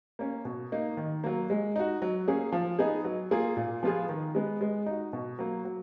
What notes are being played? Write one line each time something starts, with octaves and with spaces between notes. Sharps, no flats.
A#3 C#4
B2
A#3 D#4
D#3
F#3 A#3
G#3
D#4 F#4
F#3
A#3 C#4 G#4
F3
B3 D#4 G#4
F#3
A#3 F4 G#4
A#2
F3 B3 F4 G#4
D#3
G#3 B3
G#3
D#4 F#4
B2
F#3 A#3
F#3